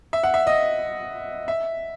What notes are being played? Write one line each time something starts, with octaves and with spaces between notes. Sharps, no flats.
E5
F#5
E5
D#5
E5